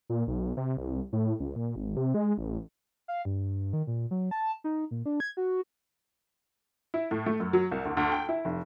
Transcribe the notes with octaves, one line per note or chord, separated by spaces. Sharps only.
A#2
B1
C3
C2
A2
C#2
A#2
G#1
C3
G#3
A1
F5
G2
D#3
A#2
F#3
A5
D#4
A#2
D4
G#6
F#4
E4
A2
A3
F#2
F#3
C2
D2
D2
G5
E4
F1